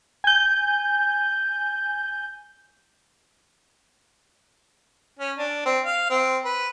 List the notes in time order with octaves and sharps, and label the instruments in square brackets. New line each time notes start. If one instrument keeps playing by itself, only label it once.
[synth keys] G#5 G6
[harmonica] C#4
D4
C4
F5
C4
B4